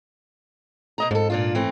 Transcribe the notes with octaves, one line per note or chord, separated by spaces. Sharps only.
B2 D#5 A#5
F2 G#2 A4
A#2 D4 F4
E3 A3 C4